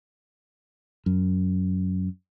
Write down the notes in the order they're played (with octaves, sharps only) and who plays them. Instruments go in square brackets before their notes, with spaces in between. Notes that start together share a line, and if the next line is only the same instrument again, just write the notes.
[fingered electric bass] F#2